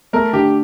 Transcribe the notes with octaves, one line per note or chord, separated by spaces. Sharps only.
A3 A#4
D3 G4